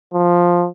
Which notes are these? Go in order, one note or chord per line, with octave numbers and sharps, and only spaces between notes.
F3